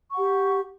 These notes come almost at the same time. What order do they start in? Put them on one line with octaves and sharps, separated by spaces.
C#6 F#5 G4